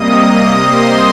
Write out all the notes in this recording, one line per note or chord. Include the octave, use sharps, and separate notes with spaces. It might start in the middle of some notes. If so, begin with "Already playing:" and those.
Already playing: C3 G3 A#3 D#5 D#6
D#5 D#6
C5 C6